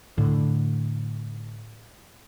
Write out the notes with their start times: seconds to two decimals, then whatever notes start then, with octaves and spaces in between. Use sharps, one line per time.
0.18 A2 D3